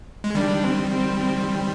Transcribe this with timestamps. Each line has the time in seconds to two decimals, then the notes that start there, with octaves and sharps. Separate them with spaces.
0.24 G#3
0.35 D#3 G3 D4
0.64 C4
0.92 C4
1.20 C4